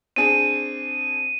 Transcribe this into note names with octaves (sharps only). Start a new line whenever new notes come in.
C4 D4 G#4 D#7